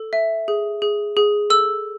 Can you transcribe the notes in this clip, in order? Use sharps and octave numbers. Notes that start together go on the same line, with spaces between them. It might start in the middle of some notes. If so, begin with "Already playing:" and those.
Already playing: A4
E5
G#4
G#4
G#4
A4 E6